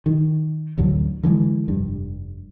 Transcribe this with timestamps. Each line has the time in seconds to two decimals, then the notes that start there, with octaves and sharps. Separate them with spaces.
0.06 D#3
0.78 A1 D2 D3 F#3
1.23 D3 E3 F3 G#3
1.68 F1 G2